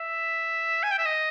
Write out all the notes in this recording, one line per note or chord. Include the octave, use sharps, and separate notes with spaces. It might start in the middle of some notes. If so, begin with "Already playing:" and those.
Already playing: E5
G#5
G5
E5
D#5